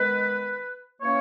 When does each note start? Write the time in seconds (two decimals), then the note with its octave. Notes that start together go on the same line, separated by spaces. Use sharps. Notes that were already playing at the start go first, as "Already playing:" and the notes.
Already playing: D#3 G#3 B3 B4
1.01 E3 A#3 C#4 C#5